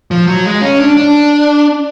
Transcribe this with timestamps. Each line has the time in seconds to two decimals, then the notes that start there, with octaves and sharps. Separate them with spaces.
0.11 F3
0.27 F#3
0.45 G#3
0.62 C#4
0.80 D4
0.97 D4